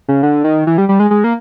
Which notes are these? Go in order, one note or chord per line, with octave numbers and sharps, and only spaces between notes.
C#3
D3
D#3
E3
G3
G3
G#3
G#3
A#3